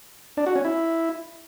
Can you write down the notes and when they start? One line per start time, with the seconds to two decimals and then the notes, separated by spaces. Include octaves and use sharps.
0.37 D4
0.46 F#4
0.56 C#4
0.65 E4